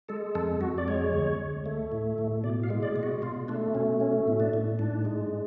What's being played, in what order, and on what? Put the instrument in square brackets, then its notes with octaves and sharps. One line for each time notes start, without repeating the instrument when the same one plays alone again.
[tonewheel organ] G#3 A4
F2 A4
F2 F#4
D5
G#3 C#5
D2
D2
A3
A2
A2
B2 D5
F5
G#3
D5
B2
F#4
B2 F4
A3 D4
B2 C#4
A3 C#4
A2
D4
A2
G#2 D4
G#3